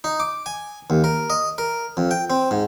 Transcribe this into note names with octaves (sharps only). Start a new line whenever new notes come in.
D#4
D6
G#5
D#2
A#4
D#5
A#4
F2
G5
C4
G#2